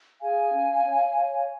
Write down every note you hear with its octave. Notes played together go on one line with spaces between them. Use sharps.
G#4 F5 G#5
C#4
C#5
C#5